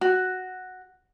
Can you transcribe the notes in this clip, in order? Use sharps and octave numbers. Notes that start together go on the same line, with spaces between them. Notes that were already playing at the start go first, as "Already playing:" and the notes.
F#4